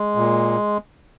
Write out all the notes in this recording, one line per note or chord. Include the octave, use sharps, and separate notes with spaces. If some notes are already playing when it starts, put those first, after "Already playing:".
Already playing: G#3
A#2